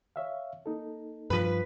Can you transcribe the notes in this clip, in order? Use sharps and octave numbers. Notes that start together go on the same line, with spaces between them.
C#5 E5 F5
A#3 D#4 A4
G2 F3 B4